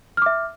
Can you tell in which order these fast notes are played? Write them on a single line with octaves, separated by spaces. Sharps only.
F6 D6 E5